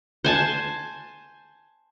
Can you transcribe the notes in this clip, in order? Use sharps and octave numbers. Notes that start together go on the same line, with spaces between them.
C5 G#5 A5